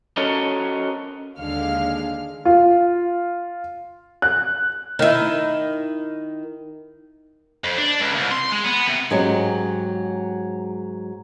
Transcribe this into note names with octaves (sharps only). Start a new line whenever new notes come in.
C#4 F#4 A4 A#4 C#5 D#5
D#2 D3 G#3 F5 F6
F4
F#6
D#3 E4
F2
D4
C#2
C2
C6
G#3
B3
C3
G#2 F#3 G#3 C#4 G4